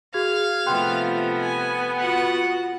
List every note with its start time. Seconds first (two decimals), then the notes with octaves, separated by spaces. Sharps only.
0.14 F#4 G#4 F5 G#6
0.66 C3 F3 A3 B3 G5 C6 F#6
1.40 G#5
1.99 F4 F#4 F#5